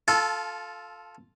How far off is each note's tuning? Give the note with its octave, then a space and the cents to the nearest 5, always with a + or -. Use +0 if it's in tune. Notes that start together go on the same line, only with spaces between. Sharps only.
F4 +0 A4 -5 A5 -30